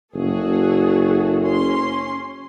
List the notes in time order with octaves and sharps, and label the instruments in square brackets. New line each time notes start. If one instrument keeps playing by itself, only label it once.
[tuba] F#1 [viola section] F#4 G#4 A4
[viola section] C#4 C6